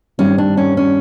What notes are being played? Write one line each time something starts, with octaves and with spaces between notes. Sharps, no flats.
G2 D#3 G3 C4 C#4
D4
C#4
C#4